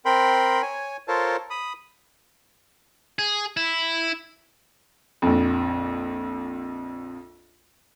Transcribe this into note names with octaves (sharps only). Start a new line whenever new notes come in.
C4 A#4 G5 B5 C6
C#5 G#5
F4 A4 A#4 C5 C#5 A5
B5 D#6
G#4
E4
A#1 F2